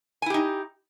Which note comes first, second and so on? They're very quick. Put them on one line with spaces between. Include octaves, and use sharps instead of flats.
G#5 E4 G4 D#4